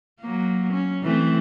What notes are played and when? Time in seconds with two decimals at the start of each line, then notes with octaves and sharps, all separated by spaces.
0.21 F#3 A#3
0.73 C#4
1.03 E3 A3 C4